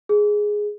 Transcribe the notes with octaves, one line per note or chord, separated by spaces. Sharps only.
G#4